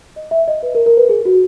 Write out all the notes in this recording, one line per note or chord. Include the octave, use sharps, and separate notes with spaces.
D#5
E5
D#5
B4
A#4
A#4
B4
G#4
F#4